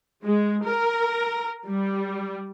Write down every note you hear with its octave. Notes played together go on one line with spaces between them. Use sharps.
G#3
A#4
G3